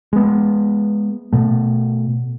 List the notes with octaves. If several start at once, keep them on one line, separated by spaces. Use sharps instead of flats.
G#3 B3
B2 A3